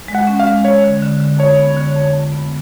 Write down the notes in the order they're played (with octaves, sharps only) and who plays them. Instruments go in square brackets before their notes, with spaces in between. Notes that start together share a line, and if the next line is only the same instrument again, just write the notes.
[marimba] G#3
[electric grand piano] F#5
[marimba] C#4
[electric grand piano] F5
[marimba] G#3
[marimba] G#3 [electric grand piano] C#5
[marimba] D3
D3
D3
[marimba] F2 [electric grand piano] C#5
[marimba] B3
D3
F2
F2
B3